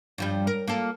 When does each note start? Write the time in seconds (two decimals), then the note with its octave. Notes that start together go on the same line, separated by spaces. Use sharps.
0.18 G2 F3 G3
0.47 A#4
0.68 A#3 F4 A4